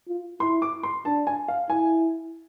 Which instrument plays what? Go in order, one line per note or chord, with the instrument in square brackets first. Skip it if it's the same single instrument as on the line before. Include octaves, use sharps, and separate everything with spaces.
[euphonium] F4
[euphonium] E4 [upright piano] C6
[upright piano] D6
C6
[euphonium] D4 [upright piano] A5
[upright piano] G#5
F5
[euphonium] E4 [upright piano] G#5